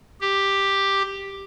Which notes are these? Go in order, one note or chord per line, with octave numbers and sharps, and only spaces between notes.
G4